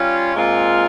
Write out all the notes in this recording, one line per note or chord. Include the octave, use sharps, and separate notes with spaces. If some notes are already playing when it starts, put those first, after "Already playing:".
Already playing: G3 C#4 F4
A#2 G#3 C4 F4